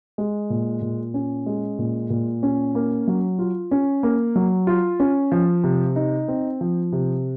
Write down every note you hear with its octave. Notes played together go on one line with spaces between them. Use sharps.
G#3
A#2
A#2
C#4
G#3
A#2
A#2
C#4
A#3
F#3
F4
C#4
A#3
F#3
F4
C#4
F3
C3
D#4
C4
F3
C3